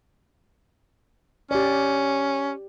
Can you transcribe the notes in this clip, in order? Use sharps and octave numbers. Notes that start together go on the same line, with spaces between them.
C#4 G4 D5